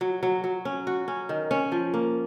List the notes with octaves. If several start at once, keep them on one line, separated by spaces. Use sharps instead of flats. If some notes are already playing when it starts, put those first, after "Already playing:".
F#3
F#3
F#3
C#4
F#4
C#4
D#3
C#4
F3
A#3